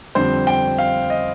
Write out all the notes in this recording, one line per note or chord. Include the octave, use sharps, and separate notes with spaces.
F2 D3 G3 C5
G5
F5
D#5